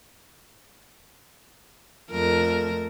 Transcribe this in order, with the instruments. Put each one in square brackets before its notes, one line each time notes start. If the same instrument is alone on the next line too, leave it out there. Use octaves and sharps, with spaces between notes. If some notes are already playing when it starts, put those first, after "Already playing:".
[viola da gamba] F2 A3 A#4